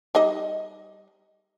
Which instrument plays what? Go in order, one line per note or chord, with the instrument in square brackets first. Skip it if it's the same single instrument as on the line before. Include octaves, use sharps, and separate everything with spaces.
[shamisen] G3 D#4 D#5